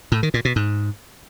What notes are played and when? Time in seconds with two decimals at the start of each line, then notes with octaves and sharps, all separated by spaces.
0.12 A2
0.23 D#3
0.34 A#2
0.45 B2
0.56 G#2